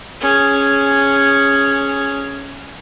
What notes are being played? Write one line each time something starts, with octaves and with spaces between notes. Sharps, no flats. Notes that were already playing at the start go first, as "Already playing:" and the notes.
C#4 G#4